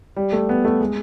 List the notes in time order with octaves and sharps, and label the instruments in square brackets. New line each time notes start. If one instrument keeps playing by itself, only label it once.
[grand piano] G3
A3
B3
A3
G#3